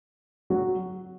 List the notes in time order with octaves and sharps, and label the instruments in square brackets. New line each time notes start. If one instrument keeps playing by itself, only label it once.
[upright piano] F#3 F#4